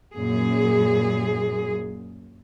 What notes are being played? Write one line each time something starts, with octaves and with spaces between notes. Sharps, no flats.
F#2 A#2 G#4